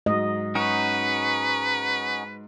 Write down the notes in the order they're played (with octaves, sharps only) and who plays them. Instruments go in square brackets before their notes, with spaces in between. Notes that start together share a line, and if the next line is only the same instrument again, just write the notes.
[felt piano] G#2 F#3 [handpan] D#5
[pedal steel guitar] C#4 D#4 F#4 [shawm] B4